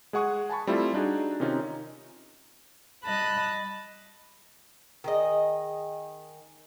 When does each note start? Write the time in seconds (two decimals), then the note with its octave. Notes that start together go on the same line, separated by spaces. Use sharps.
0.13 G#3 G#4 F#5 C#6 D#6
0.50 G#5 A5 B5 C#6
0.67 G3 A3 C4 E4 F4 A4
0.94 D4 D#4 F#4 G#4
1.40 C3 D#3 C#4 D#4 F4
3.04 G3 D#5 A5 B5 F#6
5.04 D#3 G#4 D#5